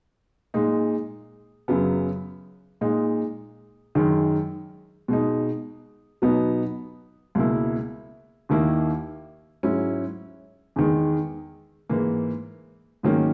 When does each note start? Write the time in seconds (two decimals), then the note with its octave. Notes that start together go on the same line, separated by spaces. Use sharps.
0.54 A#2 G#3 D#4
1.68 F#2 C#3 F#3 B3
2.81 A#2 G#3 D#4
3.95 F#2 D#3 G#3
5.08 B2 G#3 D#4
6.22 B2 F#3 B3 D#4
7.35 C#2 B2 A#3 E4
8.49 D#2 D#3 A#3 E4
9.63 G#2 F#3 C#4 E4
10.76 E2 D#3 G#3
11.89 G#2 E3 A#3
13.03 G#2 D#3 F#3 A#3 C#4